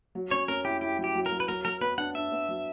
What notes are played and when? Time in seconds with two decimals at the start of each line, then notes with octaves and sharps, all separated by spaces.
0.15 F#3
0.31 C#4 C#5
0.48 C#4 A#4
0.65 E4 G4
0.81 E4 G4
0.98 F#3
1.04 G4
1.15 F#3
1.26 A#4
1.32 F#3
1.40 B4
1.48 F#3 A#4
1.65 F#3 A#4
1.81 B3 B4
1.98 D4 F#5
2.15 D4 E5
2.32 B3
2.48 F#3